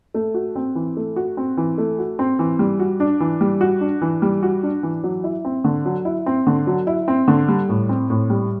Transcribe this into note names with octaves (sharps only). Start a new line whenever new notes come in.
A3
F#4
C4
E3
A3
F#4
C4
E3
A3
F#4
C4
E3
G3
F#4
D4
E3
G3
F#4
D4
E3
G3
F#4
D4
E3
F#3
E4
C4
D3
F#3
E4
C4
D3
F#3
E4
C4
D3
G3
A2
C4
A2
G3